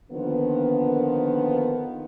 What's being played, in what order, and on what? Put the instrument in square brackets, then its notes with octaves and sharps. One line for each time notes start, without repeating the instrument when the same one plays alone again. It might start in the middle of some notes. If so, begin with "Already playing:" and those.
[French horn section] D3 D#3 F3 A#3 B3